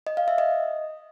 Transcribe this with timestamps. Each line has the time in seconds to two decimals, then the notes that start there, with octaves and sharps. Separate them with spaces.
0.07 D#5
0.17 F5
0.28 E5
0.38 D#5